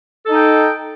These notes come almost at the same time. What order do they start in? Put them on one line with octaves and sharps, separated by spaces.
A4 D#4 G5